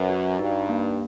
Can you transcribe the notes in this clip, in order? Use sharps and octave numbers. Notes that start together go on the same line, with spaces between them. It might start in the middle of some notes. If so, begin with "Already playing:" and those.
Already playing: F#2 B4
F#4
G2 D#4
A#3